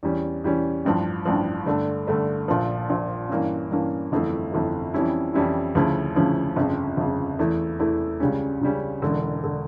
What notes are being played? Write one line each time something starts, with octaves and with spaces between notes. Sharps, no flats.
E2 E3 G3 C#4
E2 E3 G3 C#4
A1 G2 F3
A1 G2 F3
G2 D3 A3 D4
G2 D3 A3 D4
A#1 A#2 F3
A#1 A#2 F3
G2 E3 A#3 C#4
G2 E3 A#3 C#4
G1 F2 E3 A3
G1 F2 E3 A3
F2 E3 G3 C#4 E4
F2 E3 G3 C#4 E4
D2 C#3 F3 C#4 E4
D2 C#3 F3 C#4 E4
G1 F2 C#3
G1 F2 C#3
E2 E3 A3 E4
E2 E3 A3 E4
C#2 C#3 G3 C#4
C#2 C#3 G3 C#4
E1 E2 D3
D3